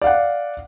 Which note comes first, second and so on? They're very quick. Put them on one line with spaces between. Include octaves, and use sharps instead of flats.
D5 F5 F#5